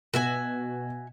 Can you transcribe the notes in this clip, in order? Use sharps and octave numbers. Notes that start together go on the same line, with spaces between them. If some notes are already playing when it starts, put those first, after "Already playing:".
B2 F#4 E5 G#5